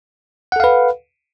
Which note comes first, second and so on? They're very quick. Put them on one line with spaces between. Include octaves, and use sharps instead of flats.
F#5 A4 F5 B4